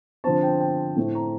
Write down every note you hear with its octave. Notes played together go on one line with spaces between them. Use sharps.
D3 F3 C4 A5
G5
G5
A2 A3 C4
A#5